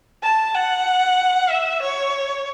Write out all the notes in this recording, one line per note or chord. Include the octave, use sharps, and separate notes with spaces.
A5
F#5
E5
C#5